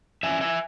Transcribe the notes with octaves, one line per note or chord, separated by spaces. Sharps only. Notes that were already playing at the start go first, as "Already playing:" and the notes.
F#2 C#3 E3 C#4 E5 G#5
E5 G#5